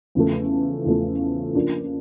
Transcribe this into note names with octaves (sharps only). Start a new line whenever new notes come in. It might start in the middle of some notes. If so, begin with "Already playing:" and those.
E2 C#3 F3 A3
E2 C#3 F3 A3
C#3 F3 A#3 D4